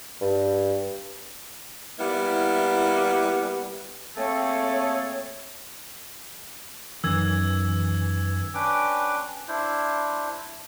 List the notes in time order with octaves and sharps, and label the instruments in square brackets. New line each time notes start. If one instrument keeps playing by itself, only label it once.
[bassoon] G2
[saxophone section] G3 A#3 B3 E4
[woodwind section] A3 A#3 C4 G#4 A4 C#5
[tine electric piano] F#2 D#3 [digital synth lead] E3 [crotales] E6 G#6
[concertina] C#4 D4 B4 G5 D6
D4 E4 C5